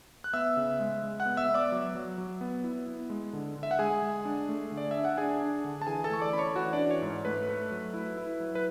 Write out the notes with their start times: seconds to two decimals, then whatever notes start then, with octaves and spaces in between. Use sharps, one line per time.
0.24 F#6
0.33 B3 E5 E6
0.57 C#3
0.80 G#3
1.03 G#3
1.20 F#5 F#6
1.26 B3
1.37 E5 E6
1.49 B3
1.54 D5 D6
1.72 F#3
1.95 F#3
2.18 F#3
2.41 B3
2.64 E4
2.87 B3
3.10 G#3
3.33 D3
3.56 D3
3.63 E5
3.71 F#5
3.79 G#3 G#4 G#5
4.02 G#3
4.25 D4
4.49 A3
4.71 D3
4.77 D5
4.91 D4 E5
5.05 F#5
5.17 D4 G#4 G#5
5.41 D4
5.64 D3
5.82 A5
5.87 E3 G#4 G#5
6.04 A4 A5
6.10 A3 C#6
6.21 D5 D6
6.33 C#4 B5
6.38 C#5 C#6
6.56 E3 F#4 F#5
6.73 D4 D5
6.79 C#4
6.91 C#5
7.02 G#2
7.25 A3 B4
7.48 A3
7.71 F#3
7.94 E4
8.17 E4
8.40 F#3
8.55 B4